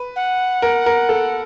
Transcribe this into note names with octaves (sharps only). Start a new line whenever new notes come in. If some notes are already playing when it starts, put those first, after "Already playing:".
Already playing: B4
F#5
A#4
A#4
A4